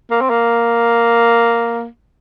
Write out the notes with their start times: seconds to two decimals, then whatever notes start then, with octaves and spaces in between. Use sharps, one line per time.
0.10 A#3
0.21 C4
0.30 A#3